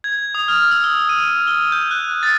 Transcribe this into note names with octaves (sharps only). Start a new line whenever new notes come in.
G#6
D#6
F6
E6
G7
D#7
G7
G6
F#6
A6